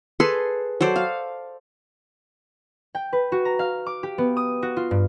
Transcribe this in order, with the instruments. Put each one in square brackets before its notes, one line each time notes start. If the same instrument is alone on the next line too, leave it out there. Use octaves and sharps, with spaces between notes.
[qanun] G#4 A4 B4 C6
F#3 A4 C5 D5
F5
[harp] G5
B4
F#4
A#5
F5
D6
G4
B3
D#6
F#4
F4
G2